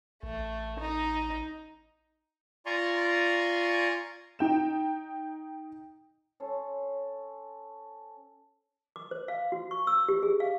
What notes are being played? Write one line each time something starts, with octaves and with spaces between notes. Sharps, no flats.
A1 A3
D#4
F4 D5 G#5 A#5 C6 C#6
D#4 G5 E7
C#4 A4 C5 C#5
D6
C5
F5
F#4
C#6
E6
G4
G#4
F5